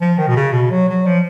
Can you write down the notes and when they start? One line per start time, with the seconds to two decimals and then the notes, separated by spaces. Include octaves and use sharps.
0.01 F3
0.18 D#3
0.28 B2
0.36 C#3
0.53 B2
0.70 F#3
0.89 F#3
1.06 F3